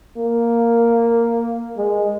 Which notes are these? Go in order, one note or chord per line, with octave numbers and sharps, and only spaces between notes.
A#3
G#3